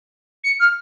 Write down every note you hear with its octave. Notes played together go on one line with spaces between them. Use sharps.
C#7
F6